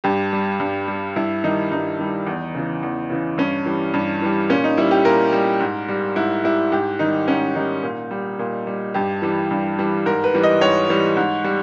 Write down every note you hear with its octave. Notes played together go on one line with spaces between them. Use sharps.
G2 G4
G3
G2
G3
G2 E4
D#3 G3 D#4
G2 D#4
D#3 G3
E2
C#3 E3
E2
C#3 E3
G2 C#4
E3 G3
G2
E3 G3
A#2 C#4
D#4
G3 E4
G4
A#2 A#4
G3
G#2
G3
G#2 E4
G3 E4
G#2 G4
D#3 G3 D#4
G#2 C#4
D#3 G3 D#4
A#2
G3
A#2
G3
G2 G4
E3 G3
G2
E3 G3
G#2 A#4
B4
E3 G3
D#5
G#2 C#5
E3 G3
G#2
G3